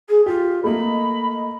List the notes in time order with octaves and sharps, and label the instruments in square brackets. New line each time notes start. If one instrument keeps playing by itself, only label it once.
[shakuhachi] G#4
[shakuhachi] F4 [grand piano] G4
[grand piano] A3 A#3 [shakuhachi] D#5 [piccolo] B5